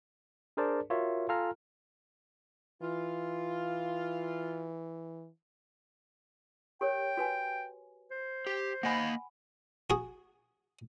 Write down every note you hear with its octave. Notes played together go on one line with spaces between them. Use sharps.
D4 G#4 A#4 C5 D5 A5
F4 F#4 A#4 C#5 E5
F4 A4 F5 G#5 A#5 F6
E3 F4
G4 A#4 C#5 G5
F#4 B4 G#5
C5
G4
A#3 D#5 F5 F#5 G#5 B5
F#4 G#4